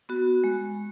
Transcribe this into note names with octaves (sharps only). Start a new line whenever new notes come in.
B3 F#4
G#3